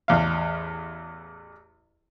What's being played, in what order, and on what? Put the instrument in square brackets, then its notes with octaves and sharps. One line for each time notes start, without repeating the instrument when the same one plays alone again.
[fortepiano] A1 E2 F5